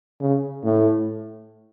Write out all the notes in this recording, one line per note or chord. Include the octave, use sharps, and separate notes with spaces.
C#3
A2